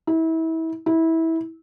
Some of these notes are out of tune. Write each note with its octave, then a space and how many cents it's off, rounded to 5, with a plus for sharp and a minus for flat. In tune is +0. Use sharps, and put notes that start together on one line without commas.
E4 -30
E4 -20